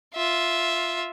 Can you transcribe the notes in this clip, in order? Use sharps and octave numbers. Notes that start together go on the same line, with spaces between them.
F4 E5